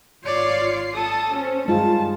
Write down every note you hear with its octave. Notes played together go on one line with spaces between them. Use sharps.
G#1 F4 C#5 D5 C7
A4 A5 D#6
C#4 C5
G2 D#3 G#3 F4 A5